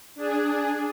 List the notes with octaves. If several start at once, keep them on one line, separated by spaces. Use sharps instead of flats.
D4 G#4